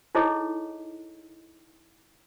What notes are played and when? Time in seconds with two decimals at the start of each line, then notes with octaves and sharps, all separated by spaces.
0.15 D#4 E4 G#4 A4 C#5 D#5